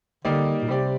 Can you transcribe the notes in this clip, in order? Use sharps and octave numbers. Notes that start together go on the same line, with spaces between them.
D3 G3 A#3 D#4 G4 D5
A#2
C3 G3 C4 G4 D5